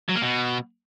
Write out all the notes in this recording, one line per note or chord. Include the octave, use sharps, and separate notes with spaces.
F#3
A#3
B2